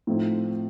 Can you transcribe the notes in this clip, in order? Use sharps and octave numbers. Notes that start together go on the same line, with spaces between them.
A2 F3 C4 D#4